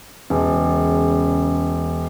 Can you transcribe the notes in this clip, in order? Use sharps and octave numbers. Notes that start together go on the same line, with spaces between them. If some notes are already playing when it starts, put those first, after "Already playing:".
E1 C#3